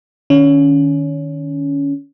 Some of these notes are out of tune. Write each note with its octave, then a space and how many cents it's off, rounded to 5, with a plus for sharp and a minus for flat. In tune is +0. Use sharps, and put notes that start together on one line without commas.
D#3 -15 C#4 +20